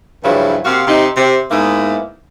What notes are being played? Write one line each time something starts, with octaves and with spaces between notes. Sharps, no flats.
G2 C#3 F3 F#3 E4
C3 A#3 F#4 F5
C3 D#4
C3
G#2 A#3 B3 E4